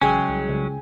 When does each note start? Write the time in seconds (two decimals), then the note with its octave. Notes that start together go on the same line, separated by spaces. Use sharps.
0.01 A1 C#3 F#3 G#3 C#4 G#4 G5 G#5
0.29 C2
0.49 C#2